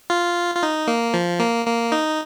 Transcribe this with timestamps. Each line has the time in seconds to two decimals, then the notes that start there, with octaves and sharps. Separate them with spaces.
0.10 F4
0.55 F4
0.63 D#4
0.87 A#3
1.14 F3
1.40 A#3
1.66 A#3
1.92 D#4